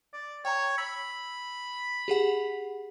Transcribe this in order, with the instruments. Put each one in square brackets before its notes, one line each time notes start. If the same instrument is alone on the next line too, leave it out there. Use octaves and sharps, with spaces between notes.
[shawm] D5
[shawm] C#5 [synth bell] G5 A#5
[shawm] B5 [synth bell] E6
[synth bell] G4 G#4 F#5